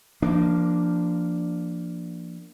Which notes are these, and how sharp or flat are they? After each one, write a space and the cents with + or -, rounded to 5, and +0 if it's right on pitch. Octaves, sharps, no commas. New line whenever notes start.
F3 -25 A#3 +0 D4 +0